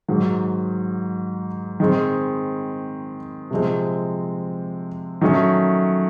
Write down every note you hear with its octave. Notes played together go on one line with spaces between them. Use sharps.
G#2 D#3 F#3
D#3 G#3 C4
C3 F3 G#3 C4
D#3 F#3 A3 C#4